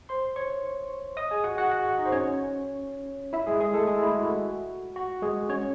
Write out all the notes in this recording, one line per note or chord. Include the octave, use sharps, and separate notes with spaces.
C5 C6
C#5 C#6
D#5 D#6
G#4 G#5
F#4 F#5
F#4 F#5
F#4 F#5
D#4 D#5
C5
C#4 C#5
E4 E5
G#3 G#4
G#3 G#4
A3 A4
G#3 G#4
E4
F#4
F#4
G#3 G#4
C#4 C#5